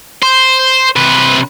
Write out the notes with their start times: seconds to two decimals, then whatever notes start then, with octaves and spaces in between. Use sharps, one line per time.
0.23 C5
0.96 C3 B4